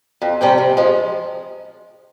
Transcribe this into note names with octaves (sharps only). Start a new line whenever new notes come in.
F2
C3 G3 C#4 G4
C3
F3 G#3